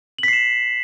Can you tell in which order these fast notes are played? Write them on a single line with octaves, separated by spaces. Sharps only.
F#7 B6 C7 E7